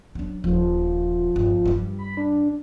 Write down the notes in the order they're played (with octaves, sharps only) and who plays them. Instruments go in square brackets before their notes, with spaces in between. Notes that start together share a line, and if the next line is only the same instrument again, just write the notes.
[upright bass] F#3 D4
[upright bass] D#1 [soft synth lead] F3
[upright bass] G1
G2 G3
[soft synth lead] B5
D4